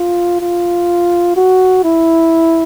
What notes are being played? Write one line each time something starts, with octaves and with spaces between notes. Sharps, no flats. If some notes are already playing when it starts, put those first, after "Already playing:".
Already playing: F4
F4
F#4
E4